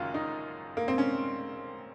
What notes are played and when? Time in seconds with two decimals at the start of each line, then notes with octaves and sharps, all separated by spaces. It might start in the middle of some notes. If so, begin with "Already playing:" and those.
Already playing: F#1 F#2 D#3 F4
0.14 D#4
0.77 A#3
0.88 C4
0.98 C#4